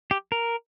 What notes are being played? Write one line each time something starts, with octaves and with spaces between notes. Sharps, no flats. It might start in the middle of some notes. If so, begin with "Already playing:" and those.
G4
A#4